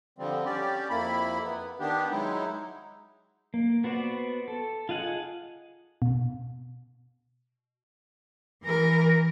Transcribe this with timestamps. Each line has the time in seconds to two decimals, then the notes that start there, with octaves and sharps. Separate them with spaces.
0.18 D3 F3 G3 C4
0.45 G3 C#4 G4 D5
0.90 F2 A#3 E4 B5
1.44 B3
1.80 D#3 B3 D4 G4
2.11 F#3 G#3 D#4 E4
3.54 A#3
3.84 B3 F#4 C5 D5
4.48 A4
4.89 F4 G#4 D#5 F#5 G#5
6.02 B2
8.63 E3 A#4